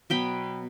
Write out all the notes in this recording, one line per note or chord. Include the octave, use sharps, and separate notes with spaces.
B2 F#3 B3 G5 B5